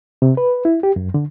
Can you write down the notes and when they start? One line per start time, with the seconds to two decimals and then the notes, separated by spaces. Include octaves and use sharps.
0.22 C3
0.37 B4
0.65 E4
0.83 G4
0.96 F#2
1.14 D3